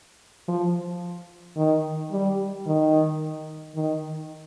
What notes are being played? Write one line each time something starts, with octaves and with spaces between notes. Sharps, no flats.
F3
D#3
G3
D#3
D#3